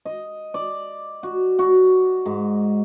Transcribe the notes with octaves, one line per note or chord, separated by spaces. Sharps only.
D#5
D5
F#4
F#4
G#2